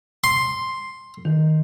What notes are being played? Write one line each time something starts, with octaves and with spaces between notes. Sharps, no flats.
C6
D#3